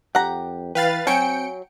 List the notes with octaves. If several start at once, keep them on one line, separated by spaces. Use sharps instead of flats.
F2 G4 F#5 A#5
E3 B4 F5 G5 A6
F#3 C4 G5 G#5 C#7 D7